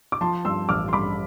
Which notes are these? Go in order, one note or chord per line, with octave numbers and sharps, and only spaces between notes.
D6
F3 A5 C6
G2 C6 E6
A1 D6 F6
C6
G2 B5 D6